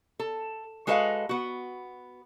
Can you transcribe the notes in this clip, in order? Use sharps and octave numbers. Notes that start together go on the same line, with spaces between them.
A4
G#3 F#4 A4 B4 D#5 F5
B3 F#4